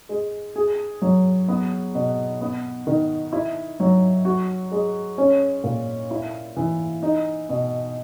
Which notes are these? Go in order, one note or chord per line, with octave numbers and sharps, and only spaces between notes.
G#3
G#4
F#3
B3
B2
B3
D#3
E4
F#3
F#4
G#3
C#4
A#2
E4
E3
D#4
B2